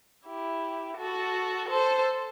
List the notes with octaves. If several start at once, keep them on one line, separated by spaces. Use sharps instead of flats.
E4 G4
F#4 A4
A4 C5